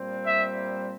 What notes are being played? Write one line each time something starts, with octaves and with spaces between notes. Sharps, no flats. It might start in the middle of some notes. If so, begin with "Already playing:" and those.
Already playing: A#2 G3 C4
E5